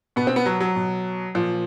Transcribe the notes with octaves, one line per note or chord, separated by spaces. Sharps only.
B2 B3
C4
B3
F#3
F#3
B2
A#2 F3